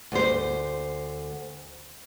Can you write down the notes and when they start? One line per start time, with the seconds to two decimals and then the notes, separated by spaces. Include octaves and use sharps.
0.12 D2 C5